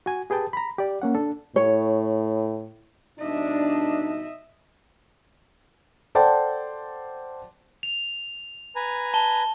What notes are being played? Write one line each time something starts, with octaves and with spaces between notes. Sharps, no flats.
F#4 G#5
G4 G#4 B4 G5 A5
A#5 B5
G4 D5
A#3 C#4 F#5
D4 A4
A2 C#5
B2 G3 D4 D#4 D#5 E5
A4 C5 D5 F#5 G5 A5
F7
B4 G#5 A#5
A5 G7